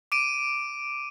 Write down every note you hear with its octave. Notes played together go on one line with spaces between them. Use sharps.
D6 D7 D#7